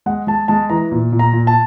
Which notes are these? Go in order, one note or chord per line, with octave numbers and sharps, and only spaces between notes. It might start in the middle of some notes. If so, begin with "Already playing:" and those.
G#3 F#5
G#3 A5
G#3 A5
E3 A#5
A#2
A#2
A#5
A#2
A5